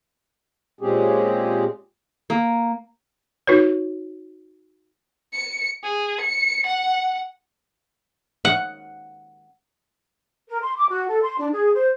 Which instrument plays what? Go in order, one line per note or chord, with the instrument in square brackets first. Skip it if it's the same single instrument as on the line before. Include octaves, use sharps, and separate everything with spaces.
[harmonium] A#2 G#3 C4 C#4 G4 G#4
[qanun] A#3
[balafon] D#4 F#4 B4 C#5
[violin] C#7
G#4
C#7
F#5
[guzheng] F#5
[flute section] A#4
C6
D6
F#4
A4
C6
D4
G#4
C5